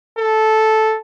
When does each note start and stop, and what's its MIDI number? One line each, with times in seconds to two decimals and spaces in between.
0.19 0.96 69